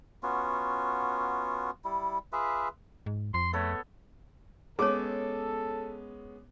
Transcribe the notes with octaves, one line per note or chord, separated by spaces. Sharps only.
B3 C#4 F4 F#4
G3 E4
F4 G#4 B4 E5
G#2
F2 C6
A3 B3 A4 C#5
G#3 B3 C#4 G#4 A4 C#5 D6